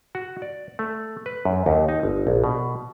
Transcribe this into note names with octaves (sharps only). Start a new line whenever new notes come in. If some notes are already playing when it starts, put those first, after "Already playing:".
F#4
D5
A3
B4
F#2
D#2
D#4
G1
A#1
B2